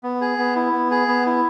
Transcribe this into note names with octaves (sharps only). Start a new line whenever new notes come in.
B3
G#4
B3
E4
B3
G#4
B3
E4